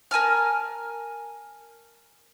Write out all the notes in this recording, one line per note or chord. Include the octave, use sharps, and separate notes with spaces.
A#4 G#5 A5 F6